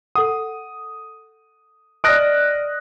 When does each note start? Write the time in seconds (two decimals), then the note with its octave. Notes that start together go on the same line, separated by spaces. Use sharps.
0.15 A4 F#5 D#6
2.04 D5 D#5 A5 D#6 F6 F#6 A#6 D7